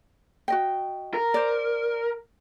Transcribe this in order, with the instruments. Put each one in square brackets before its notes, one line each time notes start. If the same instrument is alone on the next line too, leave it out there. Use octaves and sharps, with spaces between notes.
[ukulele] F#4 D#5 G5
[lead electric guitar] A#4
[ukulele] C5 D5